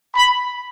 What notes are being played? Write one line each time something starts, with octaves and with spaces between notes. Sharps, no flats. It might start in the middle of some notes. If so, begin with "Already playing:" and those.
B5